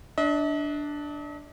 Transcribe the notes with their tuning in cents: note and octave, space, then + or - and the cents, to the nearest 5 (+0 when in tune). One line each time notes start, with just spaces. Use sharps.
D4 +0 D#5 +45